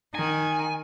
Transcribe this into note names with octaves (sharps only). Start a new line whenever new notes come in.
D#3 G#5